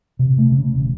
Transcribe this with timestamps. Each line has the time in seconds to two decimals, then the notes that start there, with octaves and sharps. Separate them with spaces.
0.19 C3
0.38 A3
0.52 C#3
0.73 E1